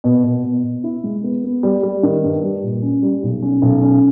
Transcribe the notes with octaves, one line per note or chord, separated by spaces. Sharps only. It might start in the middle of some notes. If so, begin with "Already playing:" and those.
B2
B2
B2
B2
E4
G#3
B3
B3
G3
G3
D#3
G2
G3
A#2
C#4
G3
B1
C#4
B1
C#4